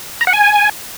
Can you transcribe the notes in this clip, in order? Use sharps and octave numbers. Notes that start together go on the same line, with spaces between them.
A#5
F#5
G#5